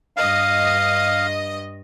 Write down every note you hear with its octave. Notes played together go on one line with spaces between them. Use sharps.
G2 D#5 F5